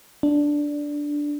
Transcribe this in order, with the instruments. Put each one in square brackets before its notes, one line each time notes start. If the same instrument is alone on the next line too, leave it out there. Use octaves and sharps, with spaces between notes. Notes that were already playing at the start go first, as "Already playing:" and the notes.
[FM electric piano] D4